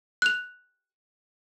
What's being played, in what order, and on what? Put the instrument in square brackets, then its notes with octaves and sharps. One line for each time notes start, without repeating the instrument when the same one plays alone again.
[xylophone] F#6 F7